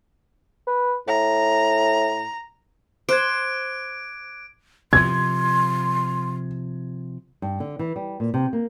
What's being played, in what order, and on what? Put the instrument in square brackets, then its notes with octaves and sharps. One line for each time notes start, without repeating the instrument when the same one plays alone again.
[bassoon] B4
[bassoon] A2 [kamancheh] A#5
[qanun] C5 [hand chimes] D6 F#6 G#6 [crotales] D7
[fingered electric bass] C3 F3 [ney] C6 [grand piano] G#6
[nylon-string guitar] G2
D3
E3
G3
A#2
C3
A#3